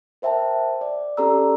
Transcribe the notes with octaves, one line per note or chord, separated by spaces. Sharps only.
A#4 C5 E5 G5 A5
D5
C#4 G4 A4 D5 A#5 E6